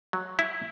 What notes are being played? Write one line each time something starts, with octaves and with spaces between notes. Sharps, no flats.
F#3
E4